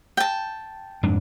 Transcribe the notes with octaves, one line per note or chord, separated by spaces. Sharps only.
G5 A5
F2 G#2 D4